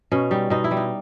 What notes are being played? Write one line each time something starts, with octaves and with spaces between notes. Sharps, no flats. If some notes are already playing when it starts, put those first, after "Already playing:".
B2 C#4
G3 D#4
B2 D#4
E4
G3
D#4